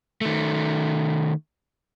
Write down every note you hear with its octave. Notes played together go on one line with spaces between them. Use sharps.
D#3 A3